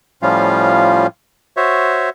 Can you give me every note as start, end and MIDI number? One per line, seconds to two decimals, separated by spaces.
0.22 1.07 45
0.22 1.07 53
0.22 1.07 55
0.22 1.07 61
0.22 1.07 65
0.22 1.07 77
1.57 2.09 66
1.57 2.09 72
1.57 2.09 73
1.57 2.09 76